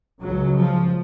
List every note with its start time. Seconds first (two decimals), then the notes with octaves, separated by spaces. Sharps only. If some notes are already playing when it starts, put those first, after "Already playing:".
0.20 C#2 C#3 F#3
0.55 F3